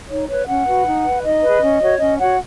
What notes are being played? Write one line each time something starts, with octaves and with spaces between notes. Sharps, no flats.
D#4 C#5
B4 C#5
C#4 F#5
F#4 B4
D#4
B4
D#4 D#5
G#4 B4
C#4
F#4 C#5
C#4 D#5
F#4 C#5 F#5